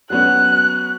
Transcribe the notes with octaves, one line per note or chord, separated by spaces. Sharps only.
F#3 B3 C#4 F#6